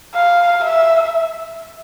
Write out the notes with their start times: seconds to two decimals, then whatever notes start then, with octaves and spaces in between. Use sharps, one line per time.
0.15 F5
0.64 E5